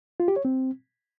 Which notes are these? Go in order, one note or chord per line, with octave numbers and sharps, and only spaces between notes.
F4
G4
C#5
C4